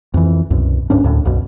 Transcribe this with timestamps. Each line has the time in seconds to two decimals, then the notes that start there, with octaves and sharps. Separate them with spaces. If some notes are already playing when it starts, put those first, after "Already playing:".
0.14 F2 E3
0.50 C2 F#2 B2
0.90 D1 G#2 C#4 D4
1.04 D2 A2
1.25 B1 F#2 B2